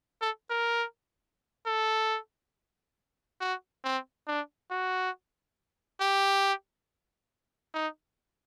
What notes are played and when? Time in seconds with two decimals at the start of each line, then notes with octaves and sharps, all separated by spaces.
0.21 A4
0.50 A#4
1.66 A4
3.40 F#4
3.84 C4
4.27 D4
4.71 F#4
6.01 G4
7.74 D#4